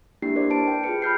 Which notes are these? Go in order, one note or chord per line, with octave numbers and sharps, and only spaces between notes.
A#3 D4 E4 G4 C7
A#4 C5 D5
B4 A5 D7
G5
F4 G#4 B4 C#7
B5 F6 G6 C7